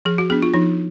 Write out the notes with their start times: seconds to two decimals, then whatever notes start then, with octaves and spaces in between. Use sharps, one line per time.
0.05 F3 G#4
0.18 F#4
0.30 B3 D4 G#4
0.42 F4
0.54 F3 D#4